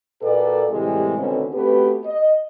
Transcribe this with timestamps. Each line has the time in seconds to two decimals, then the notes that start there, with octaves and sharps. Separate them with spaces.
0.22 A#2 A#3 F#4 A4 B4 D5
0.70 A2 C3 E3 G3 G#3
1.16 D2 B2 D3 D#3 C4 C#4
1.53 A3 B3 C4 F#4 G4 B4
2.04 D#5